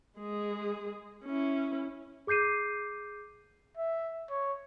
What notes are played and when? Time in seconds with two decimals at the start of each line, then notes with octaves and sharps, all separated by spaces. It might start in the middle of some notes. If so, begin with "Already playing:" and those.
0.18 G#3 G#4
1.25 C#4 E4
2.27 G#4 D6 G6 C7 D#7
3.77 E5
4.30 C#5